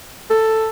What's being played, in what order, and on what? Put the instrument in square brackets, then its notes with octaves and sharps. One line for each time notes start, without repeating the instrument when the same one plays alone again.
[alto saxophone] A4